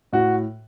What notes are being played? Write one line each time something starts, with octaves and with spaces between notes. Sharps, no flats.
A2 F#4